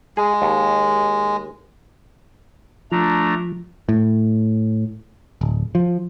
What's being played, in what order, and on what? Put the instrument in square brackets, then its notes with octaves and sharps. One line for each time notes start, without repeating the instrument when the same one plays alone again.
[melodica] G#3 [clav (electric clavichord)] G#4
[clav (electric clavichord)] D#2
[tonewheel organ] F3 [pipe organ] A3 D4 A#5
[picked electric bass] A2
D1
F3